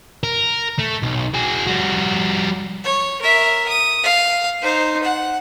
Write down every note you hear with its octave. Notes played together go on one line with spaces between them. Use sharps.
A#4
A3
B1
F#4 G#4
G3 F#4
C#5
A#4 E5
D#6
F5
D#4 C5
F#5